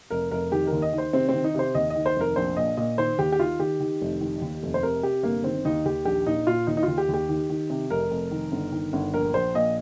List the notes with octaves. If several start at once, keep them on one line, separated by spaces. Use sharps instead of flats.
F1 A#4
F1 A#4
D#3 G4
A#4
D#2
D#5
D#3
C5
C3 C4
D#3 C4
D#4
C3 C5
D#2 D#5
D#5
D#3
C5
F1 A#4
A#1 C5
A#2 D#5
A#2 D#5
D#3 C5
D#2 G4
G4
D#3 F4
D#3 G4
D#3
F1
D#3
D#2
F1
C5
C3 A#4
C3 G4
G1 A#3
D#3 C4
D#2 D#4
D#2 G4
A#1 G4
A#2 D#4
A#2 F4
D#2 D#4
D#4
F4
D#2
G4
D#2 G4
D#3
D#3
C3
F1 A#4
F1
D#3
G1
D#3
G1
A#1 A#4
A#1 C5
A#2 D#5